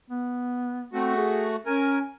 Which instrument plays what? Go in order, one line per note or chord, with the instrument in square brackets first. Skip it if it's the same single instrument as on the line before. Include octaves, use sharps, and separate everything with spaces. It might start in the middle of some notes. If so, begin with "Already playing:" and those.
[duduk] B3
[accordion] A3 F#4 [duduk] C4
[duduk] G#4
[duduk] C#4 [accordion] A#4 G#5